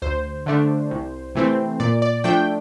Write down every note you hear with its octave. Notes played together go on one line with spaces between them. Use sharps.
D2 C5
D3 A3 D4
C2
C3 E3 A3 C4
A#2 D5
D5
F3 A3 D4 G5